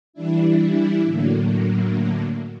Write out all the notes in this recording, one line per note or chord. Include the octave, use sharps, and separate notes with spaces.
E3 G3 D4 E4
A2 D3 F#3 A#3